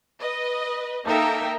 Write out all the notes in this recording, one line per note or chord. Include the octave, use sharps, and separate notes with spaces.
B4 D#5
A#3 D#4 A4 A#4 E5 G5